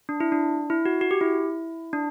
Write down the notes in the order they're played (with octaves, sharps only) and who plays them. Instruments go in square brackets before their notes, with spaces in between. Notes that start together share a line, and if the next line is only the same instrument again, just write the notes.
[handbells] D4
E4
D4
E4
F#4
F#4
G4
E4
D4